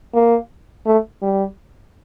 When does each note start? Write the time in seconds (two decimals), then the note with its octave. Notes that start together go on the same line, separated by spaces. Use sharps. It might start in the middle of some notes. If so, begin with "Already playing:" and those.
0.14 A#3
0.86 A3
1.22 G3